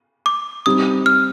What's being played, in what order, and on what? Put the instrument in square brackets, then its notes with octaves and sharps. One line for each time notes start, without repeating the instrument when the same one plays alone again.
[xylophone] D6
[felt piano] G3 C4 D#4 [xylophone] D#6
[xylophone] F6